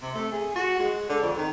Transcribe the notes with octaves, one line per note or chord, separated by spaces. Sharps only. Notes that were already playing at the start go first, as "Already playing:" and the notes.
C3
A3
G#4
F#4
G#3
D3
F2
D#3